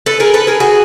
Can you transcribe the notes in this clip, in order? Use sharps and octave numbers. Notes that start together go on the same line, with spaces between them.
A4 B4
G#4 A#4
A4 B4
G#4 A#4
F#4 G#4